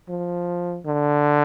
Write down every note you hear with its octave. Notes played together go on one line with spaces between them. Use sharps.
F3
D3